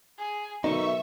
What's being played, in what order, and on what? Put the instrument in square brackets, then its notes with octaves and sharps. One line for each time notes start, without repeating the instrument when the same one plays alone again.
[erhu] G#4
[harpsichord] F#2 B2 D3 [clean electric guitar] D#4 [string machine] E5 [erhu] C#6